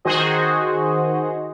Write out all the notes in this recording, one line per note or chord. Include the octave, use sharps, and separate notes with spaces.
D#3 F#4 G#4 C5 D#5